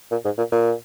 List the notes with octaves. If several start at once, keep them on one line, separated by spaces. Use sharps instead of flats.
A#2
G#2
A#2
A#2